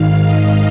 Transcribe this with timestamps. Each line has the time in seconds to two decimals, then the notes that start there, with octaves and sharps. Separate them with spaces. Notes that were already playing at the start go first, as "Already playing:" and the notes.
Already playing: G#2 D#3 F5
0.22 D#5